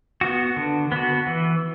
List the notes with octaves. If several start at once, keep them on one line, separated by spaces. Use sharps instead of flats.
B3 F#4
D3
B3 F#4
E3